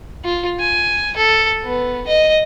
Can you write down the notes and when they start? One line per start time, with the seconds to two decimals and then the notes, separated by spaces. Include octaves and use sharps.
0.25 F4
0.60 G#5
1.17 A4
1.64 B3
2.07 D#5